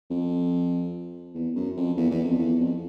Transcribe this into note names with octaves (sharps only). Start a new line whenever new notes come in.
F2
E2
F#2
F2
E2
E2
F2
E2
F2